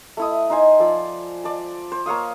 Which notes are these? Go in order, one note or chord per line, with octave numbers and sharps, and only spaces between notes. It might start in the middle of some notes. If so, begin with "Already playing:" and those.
A3 E4 D#6
D#4 C5 G#5
F3 D5 E6
D5 A5
C5
A#3 C#5 F5 D#6